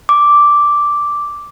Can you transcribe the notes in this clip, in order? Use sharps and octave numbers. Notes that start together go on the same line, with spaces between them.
D6